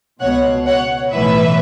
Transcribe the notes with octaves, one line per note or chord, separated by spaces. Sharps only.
C#2 B2 C#5 F#5
C#5 F#5
B1 A2 E3 B4 E5